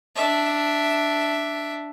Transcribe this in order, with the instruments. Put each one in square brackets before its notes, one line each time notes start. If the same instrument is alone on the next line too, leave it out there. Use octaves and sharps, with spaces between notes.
[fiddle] D4 E5